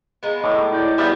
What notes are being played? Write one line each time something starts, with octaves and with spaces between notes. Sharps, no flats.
G#3 A#3 B3
A2 D6
E4 D5 D6 G6
G3 B3 G#4 E5